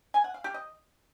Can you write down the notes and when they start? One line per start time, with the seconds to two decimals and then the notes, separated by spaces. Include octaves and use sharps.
0.14 G#5
0.24 F#5
0.34 F5
0.44 G4
0.54 D#5